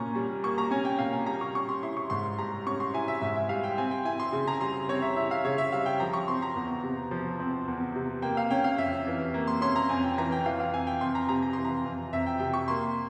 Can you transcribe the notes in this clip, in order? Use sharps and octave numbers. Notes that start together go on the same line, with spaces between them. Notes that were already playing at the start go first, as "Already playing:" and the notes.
Already playing: A#2 C#4 G#5 A#5 C#6
G3
A#3 C#6
A#5
C#4 G#5
G5
A#2 F5
G#5
G3 A#5
C#6
C#4 C#6
C6
E4 C6
C#6
G#2 C6
G3 A#5
C#4 C#6
C6
E4 G#5
E5
G#2 E5
E5
G3 F5
G5
C4 G#5
G5
E4 G#5
C6
C#3
A#5
G3 C6
C4 C#5
E5
E4 E5
F5
C#3 C#5
E5
G3 F5
G5
F3 A#5
C#6
C4 C6
A#5
E2
C3
F3
C4
E2
C3
A#3 G5
F5
C#4 G5
F5
F2 E5
E3
A#3
C6
C#4 C6
A#5
F2 G#5
G5
E3 A#5
G5
E3 F5
F5
F2 G#5
G5
F2 C6
A#5
C3 A#5
A#5
E3 C6
A#5
F2
F2 E5
G5
C3 G5
C#6
A#3 C6